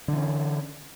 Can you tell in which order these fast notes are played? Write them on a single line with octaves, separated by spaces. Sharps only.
D3 E3 C#4